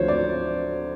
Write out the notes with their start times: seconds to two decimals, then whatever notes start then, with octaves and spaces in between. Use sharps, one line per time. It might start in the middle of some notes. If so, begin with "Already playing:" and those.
Already playing: D2 D3 F3 C5 C#5
0.08 D5